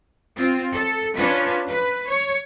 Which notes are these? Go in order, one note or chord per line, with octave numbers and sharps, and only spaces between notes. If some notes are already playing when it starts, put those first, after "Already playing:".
C4 F4
A4
C#4 D4 F4 B4
B4
C#5